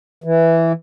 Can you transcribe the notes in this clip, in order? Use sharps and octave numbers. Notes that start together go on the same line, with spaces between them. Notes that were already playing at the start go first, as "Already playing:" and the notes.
E3